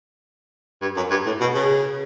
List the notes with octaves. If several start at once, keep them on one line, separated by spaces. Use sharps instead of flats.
G2
F#2
G2
A2
B2
C#3